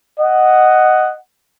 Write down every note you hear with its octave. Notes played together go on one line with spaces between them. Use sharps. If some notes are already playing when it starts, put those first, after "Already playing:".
D#5 F#5